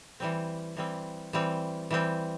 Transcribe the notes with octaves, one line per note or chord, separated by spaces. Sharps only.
E3 G3 C4
E3 G3 C4
E3 G3 C4
E3 G3 C4